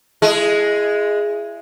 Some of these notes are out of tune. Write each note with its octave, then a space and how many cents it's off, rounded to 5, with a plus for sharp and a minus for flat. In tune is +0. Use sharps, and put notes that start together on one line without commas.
G#3 +0 E4 +35 G#4 +0